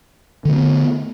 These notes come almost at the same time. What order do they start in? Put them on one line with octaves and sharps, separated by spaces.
D3 A3 C4 B3